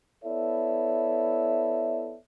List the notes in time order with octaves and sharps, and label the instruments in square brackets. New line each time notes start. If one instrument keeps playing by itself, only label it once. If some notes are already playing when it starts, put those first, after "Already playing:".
[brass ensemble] B3 E4 A4 C#5 D5 E5